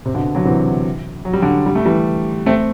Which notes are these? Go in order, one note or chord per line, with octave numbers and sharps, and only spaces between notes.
C3
B2 D3
D3 F#3
C3 E3
F#3
G3
D3 F#3
G3
A3
E3 G3
A3 C4